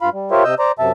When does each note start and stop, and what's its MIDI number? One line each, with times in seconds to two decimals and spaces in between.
0.01 0.09 43
0.01 0.09 65
0.01 0.09 77
0.01 0.09 83
0.13 0.31 55
0.31 0.44 65
0.31 0.44 67
0.31 0.44 70
0.31 0.44 72
0.31 0.44 73
0.31 0.44 76
0.44 0.55 48
0.44 0.55 75
0.44 0.55 88
0.44 0.55 91
0.59 0.72 72
0.59 0.72 74
0.59 0.72 82
0.79 0.92 42
0.79 0.92 48
0.79 0.92 76
0.79 0.92 81